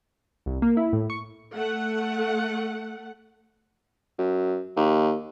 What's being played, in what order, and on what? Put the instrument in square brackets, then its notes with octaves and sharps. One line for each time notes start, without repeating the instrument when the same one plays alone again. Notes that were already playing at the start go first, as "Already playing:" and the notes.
[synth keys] C2
A#3
E4
A2
C#6
[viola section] A3 F#5
[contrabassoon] F#2
D#2